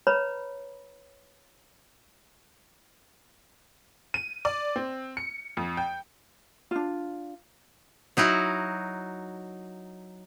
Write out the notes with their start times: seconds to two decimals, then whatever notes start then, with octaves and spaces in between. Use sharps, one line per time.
0.07 B4 C#5 A#5 B5
4.14 D#7
4.45 D5
4.76 C4
5.17 C#7
5.57 F2
5.77 G5
6.71 D4 F4
8.17 F#3 D#4 E4 F#4